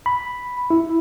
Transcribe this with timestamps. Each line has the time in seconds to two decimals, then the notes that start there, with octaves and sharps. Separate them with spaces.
0.06 B5
0.70 E4